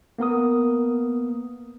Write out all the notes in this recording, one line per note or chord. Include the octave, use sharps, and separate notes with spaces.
A#3 B3 A#4 D#6